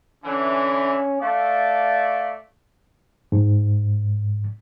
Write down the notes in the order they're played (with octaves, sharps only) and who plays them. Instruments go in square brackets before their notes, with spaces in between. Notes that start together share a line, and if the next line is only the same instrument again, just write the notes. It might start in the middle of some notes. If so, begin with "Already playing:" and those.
[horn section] D3 E3 [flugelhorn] C#4
[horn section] A3 D5 [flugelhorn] F5
[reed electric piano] G#2